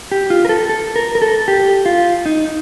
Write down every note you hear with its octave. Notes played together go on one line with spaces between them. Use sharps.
G4
F4
A#4
A4
A4
A#4
A#4
A4
G4
F4
D#4